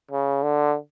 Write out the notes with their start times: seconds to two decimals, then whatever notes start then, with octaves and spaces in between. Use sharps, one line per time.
0.11 C#3
0.43 D3